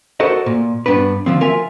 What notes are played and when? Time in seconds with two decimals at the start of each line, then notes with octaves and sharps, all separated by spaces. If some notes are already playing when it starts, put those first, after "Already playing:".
0.20 F#4 A4 A#4 C5 D#5
0.46 A#2
0.86 G2 B3 D4 B4
1.26 D3 F3 C4
1.41 F4 A#4 E5 G#5